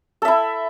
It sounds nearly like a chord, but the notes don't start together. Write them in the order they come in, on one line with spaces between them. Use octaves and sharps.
A4 E5 E4